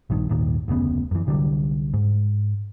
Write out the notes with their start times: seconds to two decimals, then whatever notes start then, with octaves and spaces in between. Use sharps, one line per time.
0.10 A#1 G2 D#3
0.29 G#1 D#2 A#2 D#3
0.68 F1 D2 C#3 B3
1.11 F#2 E3
1.27 C2 D3 F#3 G3
1.94 G#2